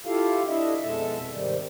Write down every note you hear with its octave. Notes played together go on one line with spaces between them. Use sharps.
E4 F4 G4 A4 F5
D4 E4 A4 D#5 E5
F2 B2 G#3 A4 E5 A5
G#2 C3 D#3 G3